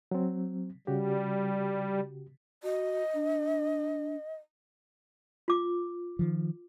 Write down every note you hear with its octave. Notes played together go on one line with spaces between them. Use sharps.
F#3 C4
C#3 G3 F#4 G4
F#4 D#5
D4
F4 D6
D#3 F3